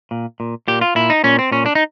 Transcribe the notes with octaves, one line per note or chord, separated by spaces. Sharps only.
A#2
A#2
A#2 G4
F4
A#2 E4
D#4
A#2 C#4
C4
A#2 C#4
D4
D#4